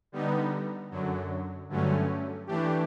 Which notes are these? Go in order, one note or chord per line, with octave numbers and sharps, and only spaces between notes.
D3 G3 B3 D#4
F#2 D3 F#3
G2 D3 F#3 A3 C#4
E3 A3 D4 G4